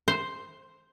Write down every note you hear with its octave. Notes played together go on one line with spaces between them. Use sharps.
C5